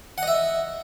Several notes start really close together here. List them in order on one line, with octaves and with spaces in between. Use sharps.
F#5 D#5 E5